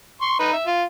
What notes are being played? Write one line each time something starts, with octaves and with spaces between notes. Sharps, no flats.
C6 C#6
D#4 B4
E5
F4